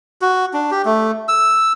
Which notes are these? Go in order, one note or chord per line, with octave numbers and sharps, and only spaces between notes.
F#4
D4
G4
A3
E6